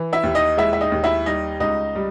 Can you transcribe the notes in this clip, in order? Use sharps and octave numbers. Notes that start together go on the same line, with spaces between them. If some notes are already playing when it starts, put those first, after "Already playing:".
Already playing: E3
E4 E5
D#2
D#4 D#5
G#3 E4 E5
E5
D#4 D#5
D#2
E4 E5
G3 D#4 D#5
C#2 D#4 D#5
G3